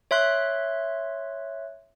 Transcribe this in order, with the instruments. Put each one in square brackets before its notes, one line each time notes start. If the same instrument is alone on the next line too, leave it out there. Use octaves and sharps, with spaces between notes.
[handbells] C#5 E5 C6 F#6